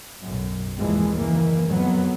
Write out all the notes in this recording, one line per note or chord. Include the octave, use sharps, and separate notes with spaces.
B1 F#2
G#1 D#2 E3 F3 G#3
F#1 D#3 E3 A#3
F2 F#3 B3